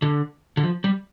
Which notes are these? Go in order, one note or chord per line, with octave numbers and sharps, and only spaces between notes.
D3
D3
F3
G3